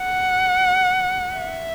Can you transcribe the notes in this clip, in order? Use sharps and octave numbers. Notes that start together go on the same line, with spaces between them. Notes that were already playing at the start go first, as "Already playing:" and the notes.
Already playing: F#5
E5